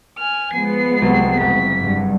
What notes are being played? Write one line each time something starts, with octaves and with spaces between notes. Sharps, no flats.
G#5 F6
F3 G#3 B3 C7
C2 F#3
F#1 B6
G2